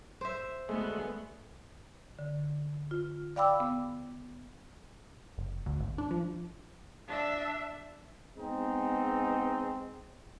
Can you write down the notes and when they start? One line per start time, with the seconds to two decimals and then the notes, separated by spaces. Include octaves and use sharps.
0.21 C5 E5
0.69 D2 G#3 A3 B3
2.19 D3
2.91 F4
3.36 D5 F5 G5 B5 D6 E6
3.60 B3
5.38 F#1
5.66 D2
5.80 G#1
5.98 D4
6.11 F3
7.08 D4 E5
8.37 G#3 B3 C4 D#4